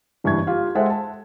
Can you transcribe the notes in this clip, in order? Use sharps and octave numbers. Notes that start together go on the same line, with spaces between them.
F#1 G2 E3 C#6 G#6
F4 G4 F5
G#3 A4 C5 E5 F#5 G5
A5